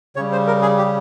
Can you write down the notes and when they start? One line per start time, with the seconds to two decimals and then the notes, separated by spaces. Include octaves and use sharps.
0.16 C#3 G3 C#5
0.32 C5
0.47 A#4
0.62 G#4
0.78 G4